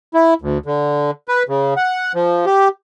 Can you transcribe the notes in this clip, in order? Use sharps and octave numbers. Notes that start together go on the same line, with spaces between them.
E4
D2
D3
B4
C#3
F#5
F3
G4